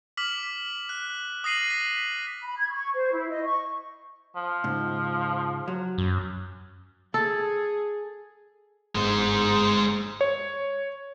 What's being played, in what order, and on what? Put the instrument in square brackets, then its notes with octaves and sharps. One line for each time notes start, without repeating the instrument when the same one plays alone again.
[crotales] D6 F6 B6 F#7
F#6
D#6 A#6 C7 D#7 F#7
B6
[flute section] B5
G#6
C#6
C5
E4
D#5
C#6
[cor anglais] F3
[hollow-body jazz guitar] C#2 G#2
F#3
[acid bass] F#2
[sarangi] G#4 [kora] A4
[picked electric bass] G1 G#2 [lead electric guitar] G#3 C5
[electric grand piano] C#5